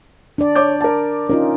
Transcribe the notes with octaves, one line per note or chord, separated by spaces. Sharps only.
D4 D5
C#5 D6 G6
A#4 A5
C#4 D#4 F4 A#4